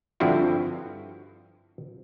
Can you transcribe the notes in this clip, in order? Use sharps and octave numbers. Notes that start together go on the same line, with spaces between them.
G2 D3 F3 C4 E4 F#4